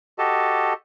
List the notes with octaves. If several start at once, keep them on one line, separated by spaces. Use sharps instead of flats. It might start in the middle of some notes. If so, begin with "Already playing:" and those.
F#4 G4 A4 D#5 A5